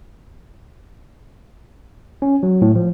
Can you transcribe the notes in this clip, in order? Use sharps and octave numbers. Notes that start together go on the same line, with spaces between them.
C#4
F#3
A2
F3